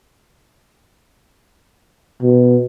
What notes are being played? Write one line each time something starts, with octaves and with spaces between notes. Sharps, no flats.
B2